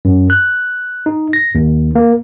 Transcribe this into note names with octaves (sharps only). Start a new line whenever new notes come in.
F#2
F#6
D#4
A#6
D#2
A#3